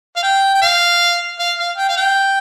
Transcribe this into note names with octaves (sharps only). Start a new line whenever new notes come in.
F5
G5
G5
F5
F5
F5
G5
F5
G5